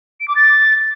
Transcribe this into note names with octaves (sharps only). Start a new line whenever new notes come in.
D7
D6
A6